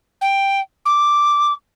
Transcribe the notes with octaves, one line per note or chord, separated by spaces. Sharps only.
G5
D6